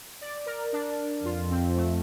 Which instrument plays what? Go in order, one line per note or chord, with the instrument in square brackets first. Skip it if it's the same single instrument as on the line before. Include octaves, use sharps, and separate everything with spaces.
[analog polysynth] D5
A#4
D4
[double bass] F2 [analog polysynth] F4
[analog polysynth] C4
A3